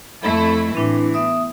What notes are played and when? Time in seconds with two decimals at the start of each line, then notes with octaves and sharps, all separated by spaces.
0.23 F2 A3 E4 A4
0.75 A2 E3 C4 D4 E4
1.14 B3 E5 D#6